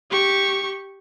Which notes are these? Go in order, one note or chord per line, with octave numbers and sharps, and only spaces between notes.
G4 C#6